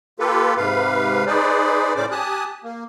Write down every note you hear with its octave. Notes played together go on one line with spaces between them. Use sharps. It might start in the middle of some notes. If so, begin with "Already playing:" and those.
A#3 F4 G4 A4 B4
G#2 C3 B4 F5
D#4 G#4 B4 C5 D5
A2 C#3 C#4 C5 D5 D6
G4 G#5 A5 D#6 F#6
A#3